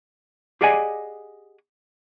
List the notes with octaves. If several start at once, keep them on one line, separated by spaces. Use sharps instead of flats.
G4 G#4 D5 D#5 F#5 G#5